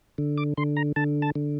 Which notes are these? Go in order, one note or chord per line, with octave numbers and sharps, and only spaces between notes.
D3
D6
D3 C6
A#5
D3 A5
A5
D3